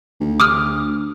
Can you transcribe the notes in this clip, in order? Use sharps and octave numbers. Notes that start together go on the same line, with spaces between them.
D2
D6 D#6 F6